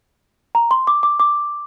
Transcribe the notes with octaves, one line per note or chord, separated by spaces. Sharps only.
A#5
C6
D6
D6
D6